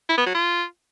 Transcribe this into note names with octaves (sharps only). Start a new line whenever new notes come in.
E4
B3
F#3
F4